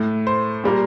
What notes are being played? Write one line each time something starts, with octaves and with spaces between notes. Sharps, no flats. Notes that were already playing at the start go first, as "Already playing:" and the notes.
Already playing: A2 A3
C5
A#2 G3 A#3